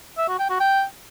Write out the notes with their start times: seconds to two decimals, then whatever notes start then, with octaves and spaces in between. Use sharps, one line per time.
0.18 E5
0.28 F#4
0.39 G5
0.50 F#4
0.60 G5